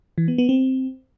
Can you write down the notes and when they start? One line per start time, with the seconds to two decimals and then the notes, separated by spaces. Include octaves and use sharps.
0.18 E3
0.28 B3
0.38 B3
0.49 C4